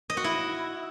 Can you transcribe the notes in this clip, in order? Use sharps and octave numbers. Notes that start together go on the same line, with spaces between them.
D#5
F#4
E4